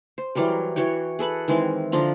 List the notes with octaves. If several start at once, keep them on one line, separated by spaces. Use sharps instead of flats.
C5
E3 F#3 G3 A#4
E3 F#4 C#5 G5
G#4 A4 B4 F#5
D#3 E3 G#3 C4
D3 F3 F4 A#5